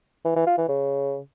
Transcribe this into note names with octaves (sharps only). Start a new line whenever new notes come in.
E3
E3
F4
E3
C#3